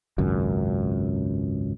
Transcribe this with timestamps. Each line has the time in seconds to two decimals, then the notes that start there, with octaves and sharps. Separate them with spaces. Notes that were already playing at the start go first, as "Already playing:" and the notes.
0.18 G#1 C#2 F#2